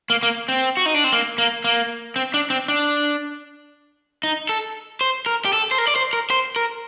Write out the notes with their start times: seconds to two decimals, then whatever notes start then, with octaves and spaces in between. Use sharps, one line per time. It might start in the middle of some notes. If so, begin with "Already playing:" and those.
0.10 A#3
0.23 A#3
0.49 C4
0.77 F#4
0.86 D#4
0.95 D4
1.04 C4
1.12 A#3
1.38 A#3
1.64 A#3
2.16 C4
2.34 D4
2.50 C4
2.68 D4
4.23 D#4
4.49 A4
5.01 C5
5.26 A#4
5.45 G4
5.53 A4
5.71 C5
5.78 A#4
5.87 D5
5.96 C5
6.13 A#4
6.30 C5
6.56 A#4